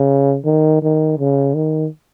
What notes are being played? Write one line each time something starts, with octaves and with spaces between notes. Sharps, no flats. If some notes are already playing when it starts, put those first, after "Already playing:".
Already playing: C#3
D#3
D#3
C#3
D#3